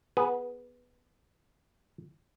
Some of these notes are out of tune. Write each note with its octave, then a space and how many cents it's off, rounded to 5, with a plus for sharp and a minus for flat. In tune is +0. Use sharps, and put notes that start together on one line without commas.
B3 +0 G#4 +0 B4 -25